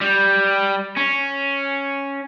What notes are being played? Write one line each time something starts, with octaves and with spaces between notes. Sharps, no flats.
G3
C#4